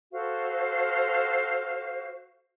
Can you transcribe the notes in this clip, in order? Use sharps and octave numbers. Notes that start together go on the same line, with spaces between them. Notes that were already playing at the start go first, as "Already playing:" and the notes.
F#4 A4 C5 F5